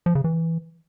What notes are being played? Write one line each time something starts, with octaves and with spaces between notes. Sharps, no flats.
F3
C#3
E3